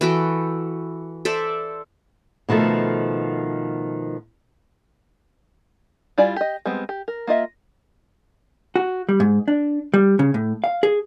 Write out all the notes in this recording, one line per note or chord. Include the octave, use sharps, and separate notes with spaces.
E3 F#4 A4 G5
A4 C5 D5 E5
B2 D#3 F3 A3 A4
G3 E4 F4 D5 G#5
G4 D#5
G3 G#3 B3 C4
G4
A#4
A#3 F4 D#5 E5
F#4
G3
G#2
D4
G3
C#3
A2
F5
G#4